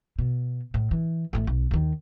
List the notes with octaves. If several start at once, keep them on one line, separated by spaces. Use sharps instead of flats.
B2
A2
E3
A1 A3
B1
D#2 D#3